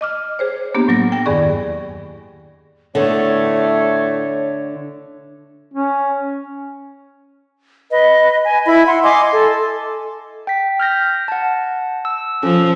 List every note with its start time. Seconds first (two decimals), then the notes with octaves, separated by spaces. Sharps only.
0.01 D#5 D6 F6
0.39 G#4 C5 C#5
0.74 A#3 B3 D4 G4
0.88 A2 F#3 A#6
1.12 G5 A#6
1.26 E2 G2 D#3 G#4 D5 C#6
2.95 A2 D3 A3 B3 C#5
5.74 C#4
7.91 B4 D#5
8.44 G#5
8.66 E4 B5
8.85 E5 F#5 C6
9.03 D#5 G#5 C6 D6
9.31 A4
10.47 G5 B6
10.80 F6 G6 A#6
11.28 F#5 A5
12.05 E6
12.43 F3 C#4 A4